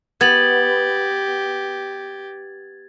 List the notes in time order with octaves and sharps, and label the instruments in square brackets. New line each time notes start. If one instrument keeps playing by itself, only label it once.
[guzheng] B3 [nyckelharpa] G4 [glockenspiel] G#6 A6 F#7